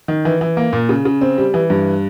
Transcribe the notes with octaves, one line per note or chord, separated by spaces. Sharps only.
D#3
E3
E3
A#3
A#2
C#3
C#3
C4
G3
E3
G2